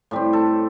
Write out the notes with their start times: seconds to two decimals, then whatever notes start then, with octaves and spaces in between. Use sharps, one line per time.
0.11 A2 G3 C4
0.33 A4